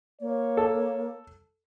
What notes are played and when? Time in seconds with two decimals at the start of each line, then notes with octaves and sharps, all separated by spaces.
0.21 A#3 C#5
0.57 A4